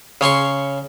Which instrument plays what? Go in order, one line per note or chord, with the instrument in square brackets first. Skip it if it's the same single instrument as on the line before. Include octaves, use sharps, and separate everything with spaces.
[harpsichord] C#3 C#5 C6 C#6